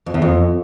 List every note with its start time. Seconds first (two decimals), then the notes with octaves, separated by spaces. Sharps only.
0.06 F2
0.14 E2
0.22 F2